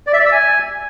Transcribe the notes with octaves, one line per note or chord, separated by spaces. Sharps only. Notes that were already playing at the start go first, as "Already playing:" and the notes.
D5
E5
D5
E6
G#5